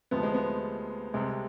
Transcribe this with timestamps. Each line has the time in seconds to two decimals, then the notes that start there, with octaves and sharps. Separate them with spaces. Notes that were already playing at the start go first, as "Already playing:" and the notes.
0.11 D2 C3 F3 G#3 B3
0.23 G#3
0.34 B3
1.14 C2 C3 G3 G#3